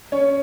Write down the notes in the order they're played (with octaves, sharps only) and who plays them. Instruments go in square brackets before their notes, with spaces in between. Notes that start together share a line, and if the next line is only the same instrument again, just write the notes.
[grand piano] C#4 C#5